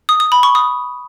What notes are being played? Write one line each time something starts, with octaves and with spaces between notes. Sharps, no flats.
D#6
D#6
B5
C#6
D#6